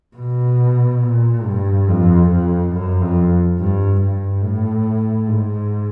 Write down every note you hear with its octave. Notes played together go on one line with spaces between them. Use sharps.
B2
A#2
G2
F2
F2
F#2
F2
G2
G2
A2
G#2